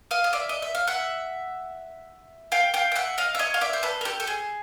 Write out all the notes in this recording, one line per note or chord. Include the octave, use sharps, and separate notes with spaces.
D#5 F5
D#5
D5 E5
D#5
E5
F5
E5 F#5
F5 G5
F5 G5
G5
E5 F#5
D#5 F5
E5
C#5 D#5
F5
D5 E5
C5
A4 B4
A#4
G4 A4
A4
G#4